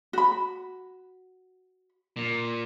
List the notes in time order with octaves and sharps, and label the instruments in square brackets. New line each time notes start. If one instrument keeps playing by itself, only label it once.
[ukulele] F#4 B5
[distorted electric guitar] A#2